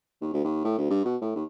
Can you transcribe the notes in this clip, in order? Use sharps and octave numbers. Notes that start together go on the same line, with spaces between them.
D#2
D2
D#2
A2
D2
G2
B2
A2
D#2